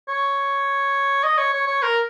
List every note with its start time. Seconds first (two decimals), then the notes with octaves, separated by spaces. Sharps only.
0.09 C#5
1.24 D#5
1.38 C#5
1.53 C#5
1.67 C#5
1.82 A#4